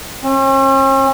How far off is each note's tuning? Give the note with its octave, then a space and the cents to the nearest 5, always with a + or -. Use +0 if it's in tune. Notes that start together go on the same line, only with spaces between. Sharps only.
C#4 -45